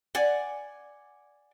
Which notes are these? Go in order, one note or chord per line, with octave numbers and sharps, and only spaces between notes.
D5 F#5 G#5